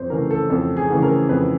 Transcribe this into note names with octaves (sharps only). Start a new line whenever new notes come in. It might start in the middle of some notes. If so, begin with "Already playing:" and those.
Already playing: F2 C5
C#3 E3 A3 A#4
A4
F2 A4
G#4
C#3 E3 A3
A#4
F2 B4